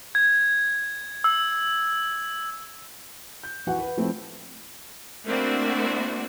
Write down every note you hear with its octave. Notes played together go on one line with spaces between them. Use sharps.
G#6
E6
G6
E3 F#4 F#5
B4
F3 A3 C4 E4 F4
A3 A#3 C4 D4 E4 F#4